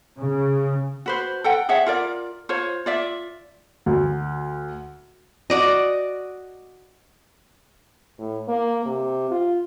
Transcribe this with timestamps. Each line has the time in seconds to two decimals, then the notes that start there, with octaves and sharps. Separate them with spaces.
0.18 C#3
1.06 F#4 B4 C5
1.44 A4 F#5 G5
1.69 G#4 C#5 E5 F#5
1.87 F4 A#4 D5
2.49 F4 C5 C#5
2.86 F4 D5 E5
3.86 D2
5.50 F#4 D5 D#5
8.19 A2
8.48 A#3
8.85 C3
9.31 F4